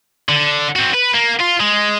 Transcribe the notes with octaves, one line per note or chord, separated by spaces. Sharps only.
D3
C4 F#4
B4
A#3
F4
G#3